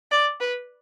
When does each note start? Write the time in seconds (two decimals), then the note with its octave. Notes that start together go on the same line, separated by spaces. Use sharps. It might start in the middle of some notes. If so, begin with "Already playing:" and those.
0.11 D5
0.41 B4